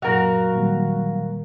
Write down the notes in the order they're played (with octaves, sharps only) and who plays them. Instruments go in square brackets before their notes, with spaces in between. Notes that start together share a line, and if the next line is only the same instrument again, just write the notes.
[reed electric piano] F#2 A#2 [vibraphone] F#3 F5 [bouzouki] F#4 A#4
[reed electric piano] A#2 D#3 G3